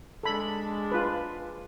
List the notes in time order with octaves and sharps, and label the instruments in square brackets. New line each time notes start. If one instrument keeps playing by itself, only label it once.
[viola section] G#3 D4 [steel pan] A4 B5
[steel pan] F4 B4